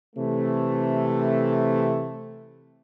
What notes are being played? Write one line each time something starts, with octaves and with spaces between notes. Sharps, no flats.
C3 E3 A3